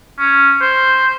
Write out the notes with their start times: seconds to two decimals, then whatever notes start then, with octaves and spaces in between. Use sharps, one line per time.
0.19 C#4
0.61 C5